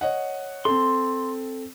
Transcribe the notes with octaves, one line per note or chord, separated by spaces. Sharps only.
C#5 D#5 F#5
C4 A4 C6